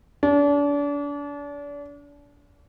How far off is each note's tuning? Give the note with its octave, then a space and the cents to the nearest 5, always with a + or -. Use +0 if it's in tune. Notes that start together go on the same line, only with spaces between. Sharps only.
D4 -35